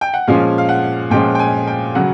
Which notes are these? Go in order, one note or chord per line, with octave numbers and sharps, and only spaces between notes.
G5
F#5
A#2 F3 G#3 C#4 F5
F5
F#5
A#2 F3 G#3 C#4 G5
G5
G#5
G5
C#3 F#3 F#5